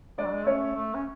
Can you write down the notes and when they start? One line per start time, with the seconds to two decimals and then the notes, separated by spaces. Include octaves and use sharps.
0.18 G#3 D4 D5
0.25 F#3
0.32 G#3
0.47 A3 C#4 C#5
0.75 A3
0.94 C#4